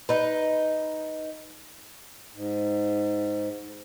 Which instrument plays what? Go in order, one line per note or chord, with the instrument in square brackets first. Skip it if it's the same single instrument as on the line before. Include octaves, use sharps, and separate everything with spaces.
[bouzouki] D#4 B4
[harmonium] G#2